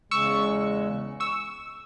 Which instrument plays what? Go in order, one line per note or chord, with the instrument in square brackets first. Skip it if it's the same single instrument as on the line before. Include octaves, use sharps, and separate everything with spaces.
[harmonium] E2 C#3 G#3 [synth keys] C#6 E6
[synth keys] C#6 E6